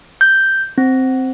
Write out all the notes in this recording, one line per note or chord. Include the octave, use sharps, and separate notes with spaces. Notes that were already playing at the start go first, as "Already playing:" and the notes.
G6
C4